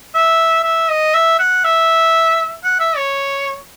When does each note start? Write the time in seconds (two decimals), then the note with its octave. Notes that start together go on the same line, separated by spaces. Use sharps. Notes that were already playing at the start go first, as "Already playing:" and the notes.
0.15 E5
0.64 E5
0.89 D#5
1.14 E5
1.39 F#5
1.64 E5
2.63 F#5
2.80 E5
2.97 C#5